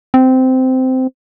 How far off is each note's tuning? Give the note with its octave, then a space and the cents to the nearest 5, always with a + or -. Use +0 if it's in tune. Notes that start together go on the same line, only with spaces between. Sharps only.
C4 -15